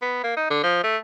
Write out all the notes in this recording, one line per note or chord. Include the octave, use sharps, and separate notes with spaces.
B3
A#3
D#4
D3
F3
A3